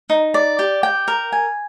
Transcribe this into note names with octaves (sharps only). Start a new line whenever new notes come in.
D#4
D5
G4
G5
A#4
G#5